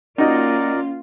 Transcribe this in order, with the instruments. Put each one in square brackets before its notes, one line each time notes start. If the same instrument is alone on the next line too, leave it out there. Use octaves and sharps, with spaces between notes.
[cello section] A#3 F4 [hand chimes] C#4 [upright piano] D#4 F#4 D#5 [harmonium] A#4 D5